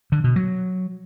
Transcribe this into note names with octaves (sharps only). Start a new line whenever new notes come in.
D3
B2
F#3